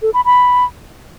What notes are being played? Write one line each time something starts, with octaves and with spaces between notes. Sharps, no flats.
A4
B5
B5